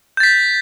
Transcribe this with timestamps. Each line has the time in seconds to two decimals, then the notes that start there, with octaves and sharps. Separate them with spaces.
0.17 G6
0.20 A6
0.23 B6